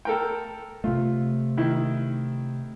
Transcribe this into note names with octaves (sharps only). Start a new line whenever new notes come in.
A4 A#4 G5
C3 A3 F4
D#3 E4